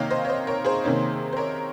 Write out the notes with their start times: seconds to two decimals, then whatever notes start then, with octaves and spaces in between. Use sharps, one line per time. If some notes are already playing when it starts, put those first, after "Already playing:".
Already playing: C3 D#3 A#3 C#5 D#5 F5 G5
0.10 C5 D#5
0.25 C#5
0.29 C5 D#5
0.47 A#4 C#5
0.65 G#4 C5
0.84 C3 D#3 A#3 C#4
1.33 C5
1.37 A#4 C#5